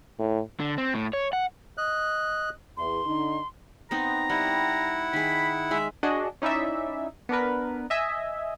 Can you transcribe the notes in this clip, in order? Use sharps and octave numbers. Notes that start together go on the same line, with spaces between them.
A2
D3
C4
A2
C#5
F#5
D#5 F#6
E2 C6
D3 D#4
B3 C4 D#4 A#5
G3 E4 F#5
D#3 G#4 B5
G#3 E5
D4 F#4 G#4 D#5
C#4 D#4 E4 D5 E5
B3 D4 A#4 B4
D#5 E5 G#5